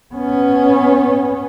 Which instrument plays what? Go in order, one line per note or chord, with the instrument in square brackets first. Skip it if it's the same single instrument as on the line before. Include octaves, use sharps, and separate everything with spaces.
[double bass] B3 C#4